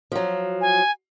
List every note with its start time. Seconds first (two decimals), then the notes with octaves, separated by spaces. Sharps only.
0.12 F3 F#3
0.61 G#5